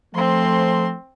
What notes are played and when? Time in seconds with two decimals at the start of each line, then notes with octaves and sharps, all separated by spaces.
0.15 F3 A3 C4 C6